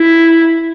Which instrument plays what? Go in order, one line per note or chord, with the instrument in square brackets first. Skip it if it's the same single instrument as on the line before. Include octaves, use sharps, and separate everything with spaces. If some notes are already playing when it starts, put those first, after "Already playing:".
Already playing: [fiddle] E4